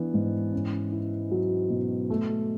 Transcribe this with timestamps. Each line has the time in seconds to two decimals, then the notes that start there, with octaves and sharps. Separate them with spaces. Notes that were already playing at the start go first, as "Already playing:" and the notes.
Already playing: E3 B3 D4
0.14 G#2
0.53 C#4
0.92 E4
1.31 F#3
1.70 B2
2.10 A3